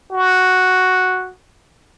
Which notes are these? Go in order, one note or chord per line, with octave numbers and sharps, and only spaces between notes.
F#4